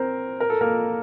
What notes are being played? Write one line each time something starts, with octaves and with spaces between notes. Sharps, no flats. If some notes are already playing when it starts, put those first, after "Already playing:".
Already playing: C4 A#4 C5
A#4
A4
A#3 A#4